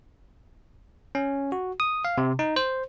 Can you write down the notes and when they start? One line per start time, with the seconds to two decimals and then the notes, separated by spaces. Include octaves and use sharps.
1.15 C#4
1.52 F#4
1.80 D#6
2.05 F5
2.18 C3
2.39 D#4
2.56 C5